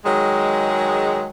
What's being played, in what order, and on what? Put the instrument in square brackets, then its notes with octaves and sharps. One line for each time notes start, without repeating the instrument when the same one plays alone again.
[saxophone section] D#3 F#3 G#3